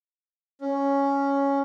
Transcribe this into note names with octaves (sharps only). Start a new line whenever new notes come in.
C#4